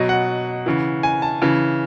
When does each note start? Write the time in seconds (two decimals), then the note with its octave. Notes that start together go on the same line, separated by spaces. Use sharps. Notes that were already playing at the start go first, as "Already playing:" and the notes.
Already playing: B2 F#3 D#5
0.09 F#5
0.66 C#3 E3
1.03 G#5
1.22 A5
1.42 C#3 E3